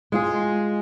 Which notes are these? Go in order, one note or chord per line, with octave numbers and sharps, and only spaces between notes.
G#3 F4 G#4